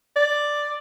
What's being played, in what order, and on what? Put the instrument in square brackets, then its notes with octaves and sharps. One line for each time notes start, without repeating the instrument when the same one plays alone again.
[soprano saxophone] D5